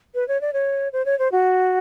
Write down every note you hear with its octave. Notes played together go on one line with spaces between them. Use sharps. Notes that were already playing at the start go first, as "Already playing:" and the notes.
B4
C#5
D5
C#5
C5
C#5
C5
F#4